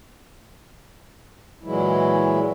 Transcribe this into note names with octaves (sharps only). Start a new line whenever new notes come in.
A#2 E3 F#3 G#3 E4